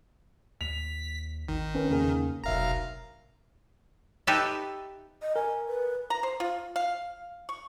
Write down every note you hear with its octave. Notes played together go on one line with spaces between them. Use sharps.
D#2 B6 F7
G#1 D#3
C#4 A#4 B4
E2 C#3 A#3 G#4
F1 B1 A#4 E5 F5 A#5
D#4 G4 A4 B4 E5
D#5
A#4 G#5
B4
A#5
C5
F4
F5
C#6